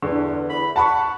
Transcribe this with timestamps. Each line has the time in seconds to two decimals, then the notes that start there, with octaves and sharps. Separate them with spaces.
0.03 E2 D3
0.50 E2 B5
0.76 F#5 A5 B5 C#6